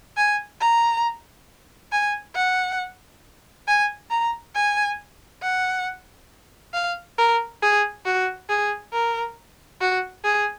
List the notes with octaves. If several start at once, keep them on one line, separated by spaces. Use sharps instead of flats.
G#5
A#5
G#5
F#5
G#5
A#5
G#5
F#5
F5
A#4
G#4
F#4
G#4
A#4
F#4
G#4